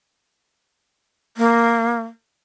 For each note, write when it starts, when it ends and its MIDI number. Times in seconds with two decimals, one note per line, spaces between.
1.37 2.02 58